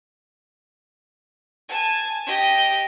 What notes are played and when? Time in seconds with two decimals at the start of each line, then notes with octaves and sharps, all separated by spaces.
1.69 G#5 A5
2.26 G4 D#5